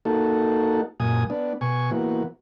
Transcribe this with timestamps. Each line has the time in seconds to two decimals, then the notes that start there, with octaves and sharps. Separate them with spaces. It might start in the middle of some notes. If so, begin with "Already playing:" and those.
0.05 A#3 D#4 F#4 A4
1.00 F#2 A#2 G#5 D#6
1.30 B3 D4
1.61 B2 G#5 C#6
1.91 E3 A#3 B3 F#4